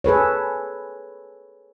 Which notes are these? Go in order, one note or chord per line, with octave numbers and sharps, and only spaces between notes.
G#4 A4 B4 C#5